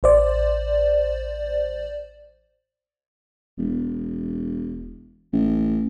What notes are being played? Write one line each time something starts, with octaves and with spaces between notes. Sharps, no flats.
A1 C5 D5
E1
A1